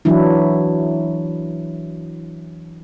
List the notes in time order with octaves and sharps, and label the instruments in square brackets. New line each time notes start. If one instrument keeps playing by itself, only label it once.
[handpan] E3 F#3 D4 E4